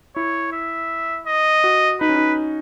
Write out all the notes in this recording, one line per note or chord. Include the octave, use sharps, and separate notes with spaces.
E4 C#5
E5
D#5
F#4
D#4 B4
C#4
D#4